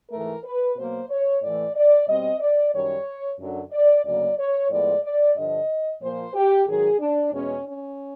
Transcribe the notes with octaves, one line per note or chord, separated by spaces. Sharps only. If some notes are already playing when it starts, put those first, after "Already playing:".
G#2 E3 A3 A#4
B4
B2 F#3 A#3 C5
C#5
A2 E3 A3 D5
D5
B2 G3 C4 D#5
D5
F#2 D#3 G3 C#5
F#2 D3 F#3
D5
D2 C#3 F#3 A#3 D5
C#5
A2 F3 G#3 B3 D5
D5
G2 D3 F3 D#5
A#2 F3 A#3 C5
G4
G#2 D#3 F#3 G#4
D4
E2 B2 G#3 C#4
C#4